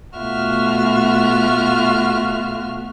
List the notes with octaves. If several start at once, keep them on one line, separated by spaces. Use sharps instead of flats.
B2 A3 F4 F#4 E5 F6